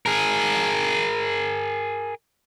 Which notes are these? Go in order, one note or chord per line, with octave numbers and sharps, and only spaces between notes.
G#4 A#4